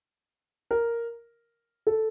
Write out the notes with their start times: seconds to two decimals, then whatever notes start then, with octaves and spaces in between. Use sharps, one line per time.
0.71 A#4
1.87 A4